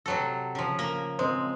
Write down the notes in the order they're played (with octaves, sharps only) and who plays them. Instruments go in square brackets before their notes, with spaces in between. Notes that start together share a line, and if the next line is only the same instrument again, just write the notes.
[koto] C3 F#3 A4
C#3 F3
A#3 A#4
[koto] G#3 [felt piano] C4